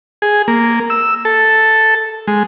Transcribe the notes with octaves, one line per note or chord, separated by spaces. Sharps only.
G#4
A#3
E6
A4
G#3